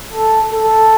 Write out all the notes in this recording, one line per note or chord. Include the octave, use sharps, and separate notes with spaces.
A4
A4